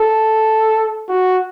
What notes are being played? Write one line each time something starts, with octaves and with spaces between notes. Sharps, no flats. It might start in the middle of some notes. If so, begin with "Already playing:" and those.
Already playing: A4
F#4